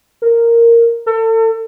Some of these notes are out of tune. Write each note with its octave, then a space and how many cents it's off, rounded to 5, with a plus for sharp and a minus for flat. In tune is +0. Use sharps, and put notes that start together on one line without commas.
A#4 -5
A4 +35